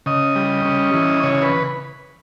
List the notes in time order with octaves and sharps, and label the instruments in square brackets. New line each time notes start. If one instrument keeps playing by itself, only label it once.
[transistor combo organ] C#3 D#5
G3
C#4
E3
C#3 C#5
B4